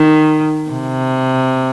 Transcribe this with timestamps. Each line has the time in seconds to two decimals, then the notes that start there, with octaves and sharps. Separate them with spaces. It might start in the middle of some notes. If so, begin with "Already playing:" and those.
Already playing: D#3
0.71 C3